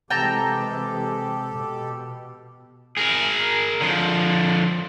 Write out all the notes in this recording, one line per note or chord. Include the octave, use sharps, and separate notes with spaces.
C3 E3 G#3 G4 A4 G5 A5 A#5
B2
G#4 A#4
D3 F3